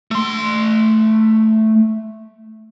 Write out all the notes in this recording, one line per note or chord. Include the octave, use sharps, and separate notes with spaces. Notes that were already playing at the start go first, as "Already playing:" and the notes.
A3 C6